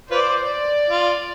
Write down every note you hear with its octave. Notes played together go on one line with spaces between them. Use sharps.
F4 B4 C5 D5
D5
F4